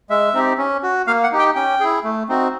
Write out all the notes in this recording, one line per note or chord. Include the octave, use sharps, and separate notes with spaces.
G#3 E5
C4 D#4 G4
C#4
F#4
A#3 F5
F#5
D#4 G4
G5
C#4 G5
E4 G#4
A3
C4 D#4 F#4